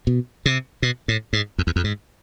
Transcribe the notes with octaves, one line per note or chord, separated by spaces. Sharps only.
B2
C3
B2
A2
G#2
F2
E2
F2
G#2